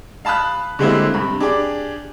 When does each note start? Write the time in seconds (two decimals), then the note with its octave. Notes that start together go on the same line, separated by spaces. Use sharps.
0.25 F5 A5 B5 D#6 F#6
0.79 D3 G3 G#3 A#3 C4 E4
1.14 G2 C3 B5
1.40 D4 G4 G#4 D5